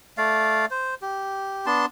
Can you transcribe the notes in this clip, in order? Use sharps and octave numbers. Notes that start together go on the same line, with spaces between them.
A3 D5 F5
C5
G4
B3 D4 A5 C6